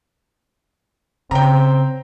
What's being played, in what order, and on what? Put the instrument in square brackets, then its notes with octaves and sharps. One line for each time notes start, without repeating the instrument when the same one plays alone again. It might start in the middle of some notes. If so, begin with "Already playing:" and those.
[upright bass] C#3 [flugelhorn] C4 [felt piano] G5 A#5